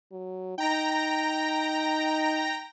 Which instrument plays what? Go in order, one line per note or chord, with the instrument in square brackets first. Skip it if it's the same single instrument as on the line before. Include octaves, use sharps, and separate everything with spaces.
[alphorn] F#3
[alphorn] D#4 [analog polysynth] G5 A#5 A#6